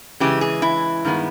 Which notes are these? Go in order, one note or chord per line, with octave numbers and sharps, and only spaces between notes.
C#3 E3 G#3 G4
G#4
E4
G2 D#3 G#3 B3